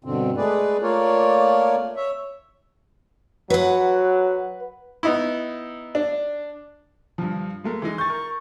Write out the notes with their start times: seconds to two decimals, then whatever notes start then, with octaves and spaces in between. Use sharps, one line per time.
0.04 G2 B2 D3 C4
0.37 G#3 A3 G#4 B4 D5
0.82 A3 A#3 F4 A#4 C#5 D5
1.97 C#5 E5
3.50 F#3 B4 F#5
5.03 B3 D#4 E4
5.95 D4
7.18 G2 F3
7.64 G#3 A3 A#4
7.82 E3 G#3 D#4
7.98 C#6 G6 A6
8.10 A#4